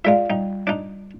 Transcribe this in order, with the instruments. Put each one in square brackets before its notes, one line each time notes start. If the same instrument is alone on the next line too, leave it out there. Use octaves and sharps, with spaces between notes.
[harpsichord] G#3 E5 [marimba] F4 D5 F5
[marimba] G3 [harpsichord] D#4
[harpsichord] D4 D#4